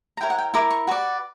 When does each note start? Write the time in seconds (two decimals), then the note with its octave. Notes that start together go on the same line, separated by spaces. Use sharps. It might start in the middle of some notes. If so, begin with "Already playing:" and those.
0.17 A#5
0.21 E4 A#4 C#5 G5
0.30 F#5
0.38 G5
0.54 E4 A#4 D6
0.70 C#6
0.87 F#4 B4 D5 C#6